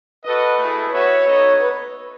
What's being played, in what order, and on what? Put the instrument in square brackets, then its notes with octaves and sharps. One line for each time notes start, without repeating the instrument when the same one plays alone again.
[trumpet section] F#4 A4 D#5 [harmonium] B4
[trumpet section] A3 E4 G#4
[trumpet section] B3 F#4 B4 E5 [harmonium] C#5
[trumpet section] B3 D#4 A4 D#5
[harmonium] B4